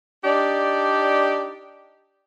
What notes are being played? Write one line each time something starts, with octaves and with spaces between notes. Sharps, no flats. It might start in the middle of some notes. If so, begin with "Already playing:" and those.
D4 D#4 G4 D5